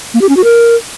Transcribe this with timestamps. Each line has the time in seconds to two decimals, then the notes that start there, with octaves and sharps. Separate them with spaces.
0.14 A#3
0.22 G4
0.29 C#4
0.37 F#4
0.44 A#4